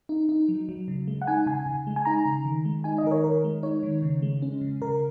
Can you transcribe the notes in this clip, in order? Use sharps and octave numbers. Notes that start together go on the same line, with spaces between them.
D#4
D#4
F#3
F#3
C#3
G#3
F#5
D#4 G#5
C#3 G#5
C#3
G#3
G#5
D#4 A#5
C#3
D#3
G#3
D#4 G#5
D#5
D#3 A#4
C#5
D#3 A#4
G#3
D#4 C#5
D#3
C#3
G#3
C#4
C#3
C#3 A#4